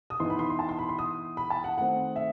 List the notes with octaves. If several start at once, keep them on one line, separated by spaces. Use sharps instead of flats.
D#6
E3 B3 D#4 C6
B5
C6
C6
A5
C6
B5
C6
D#6
B5
A5
F#5
D#3 A3 C4 F#5
E5